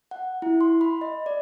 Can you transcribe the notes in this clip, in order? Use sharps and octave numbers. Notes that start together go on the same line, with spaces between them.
F#5
E4
C6
B5
D#5
D5